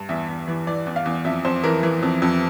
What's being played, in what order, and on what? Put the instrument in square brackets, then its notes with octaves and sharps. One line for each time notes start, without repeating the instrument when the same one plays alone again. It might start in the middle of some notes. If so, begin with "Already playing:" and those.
Already playing: [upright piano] G2
E2 E5
E2
E3
E3 D5
E2
F5
E2
F2 E5
F2 C5
E3 A#4
E3
F2
F2